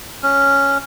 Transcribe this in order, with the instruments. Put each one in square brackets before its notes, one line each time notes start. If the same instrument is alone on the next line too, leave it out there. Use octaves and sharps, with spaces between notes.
[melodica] C#4